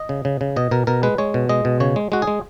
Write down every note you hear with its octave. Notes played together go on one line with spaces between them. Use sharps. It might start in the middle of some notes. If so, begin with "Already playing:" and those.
Already playing: D#5
C#3
C#3
C#3
B2 D#5
B2 A#4
B2 A#4
G#3 B4
G#3 C#5
B2
G#3 D#5
B2
C#3 C#5
G#3
G#3 F#4
G#4
G#3